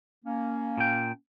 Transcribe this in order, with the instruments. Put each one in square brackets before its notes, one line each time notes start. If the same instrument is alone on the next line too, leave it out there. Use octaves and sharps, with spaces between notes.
[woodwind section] A#3 C#4
[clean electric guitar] A#2 G5